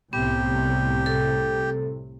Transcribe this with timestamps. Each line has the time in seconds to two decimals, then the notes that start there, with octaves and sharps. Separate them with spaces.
0.13 C2 A2 C3 B3 G4
1.06 A4